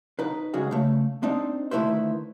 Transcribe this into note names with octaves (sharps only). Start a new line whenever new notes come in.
D#4 B4
C#2 G2 G#3 C#4 F#4 G#4
C#3 A3
C4 D4 D#4
D2 D#3 A3 E4 B4 C5